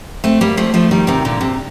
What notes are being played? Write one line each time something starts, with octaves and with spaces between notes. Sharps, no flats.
A3 C4
G3 A#3
F3 A3
F3 A3
D#3 G3
C3 D#3
A#2 D3
C3